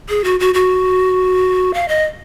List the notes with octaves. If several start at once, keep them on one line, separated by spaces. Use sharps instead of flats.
G#4
F#4
F#4
F#4
F5
D#5